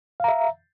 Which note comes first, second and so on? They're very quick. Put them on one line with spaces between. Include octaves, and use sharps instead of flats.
F5 A#5 E5